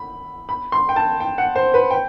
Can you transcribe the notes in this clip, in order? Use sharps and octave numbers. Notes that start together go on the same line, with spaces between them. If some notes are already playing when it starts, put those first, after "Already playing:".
Already playing: B5
B5
C6
G5
A5
G5
F#5
C5
B4
G5